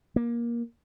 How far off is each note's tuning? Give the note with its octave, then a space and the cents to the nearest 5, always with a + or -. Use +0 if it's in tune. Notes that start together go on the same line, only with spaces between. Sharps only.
A#3 +20